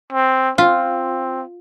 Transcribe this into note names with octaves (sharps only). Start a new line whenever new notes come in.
C4
C4 F4